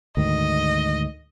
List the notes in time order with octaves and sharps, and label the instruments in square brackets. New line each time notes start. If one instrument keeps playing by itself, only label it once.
[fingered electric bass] D2 G#2 D#3 [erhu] D#5